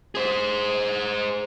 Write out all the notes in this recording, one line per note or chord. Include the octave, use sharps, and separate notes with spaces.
G#4 C5